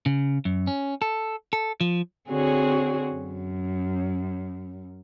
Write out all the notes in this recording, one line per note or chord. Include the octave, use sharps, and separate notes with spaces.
C#3
F#2
C#4
A4
A4
F3
D3 C4 F#4 G#4 C#5
F#2